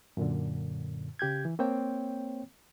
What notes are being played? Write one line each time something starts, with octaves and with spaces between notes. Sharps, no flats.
F#2 A#2 D3
C#3 G4 G6 G#6
E3
A#3 C4 C5 C#5 G5